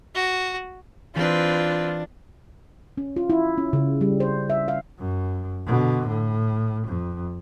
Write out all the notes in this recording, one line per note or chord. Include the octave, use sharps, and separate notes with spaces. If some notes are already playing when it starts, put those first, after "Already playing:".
F#4
E3 C4 D4 F4 B4 B6 D#7
C#4
F4
E4
C#4
C#3
G3
C5
E5
F5
F#2
B2 D3
A2
F2